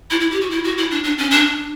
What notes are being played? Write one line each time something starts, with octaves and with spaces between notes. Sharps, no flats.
E4
E4
G4
F#4
E4
F#4
E4
D4
D4
C#4
D4